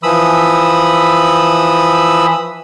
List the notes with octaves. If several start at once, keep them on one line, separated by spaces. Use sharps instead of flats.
E3 F3 B5 D#6 E6